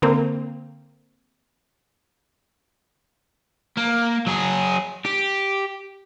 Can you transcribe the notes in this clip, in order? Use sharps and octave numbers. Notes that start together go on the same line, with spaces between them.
D3 A#3 C4
A#3
F#3 G#4
G4